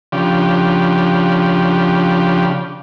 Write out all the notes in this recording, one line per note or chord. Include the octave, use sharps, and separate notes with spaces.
C#3 F3 D4 G4